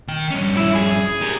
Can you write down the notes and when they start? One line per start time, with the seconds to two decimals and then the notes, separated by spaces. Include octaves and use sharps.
0.08 D#3 G5
0.30 G2 C#4
0.57 E4
0.75 G#4
1.22 G4 A#4